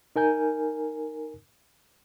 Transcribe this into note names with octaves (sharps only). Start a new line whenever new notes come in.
D#4 A#4 G#5 G6